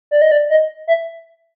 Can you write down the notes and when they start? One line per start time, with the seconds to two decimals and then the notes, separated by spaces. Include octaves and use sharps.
0.11 D5
0.22 D#5
0.31 D5
0.50 D#5
0.87 E5